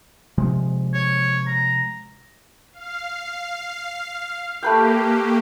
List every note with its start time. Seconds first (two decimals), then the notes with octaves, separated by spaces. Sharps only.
0.38 C3 F3 G#3
0.94 C#5
1.48 A#5
2.73 F5
4.63 A3 A#3 G4 B4 G5